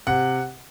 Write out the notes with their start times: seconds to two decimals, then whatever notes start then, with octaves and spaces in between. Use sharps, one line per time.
0.07 C3 F#5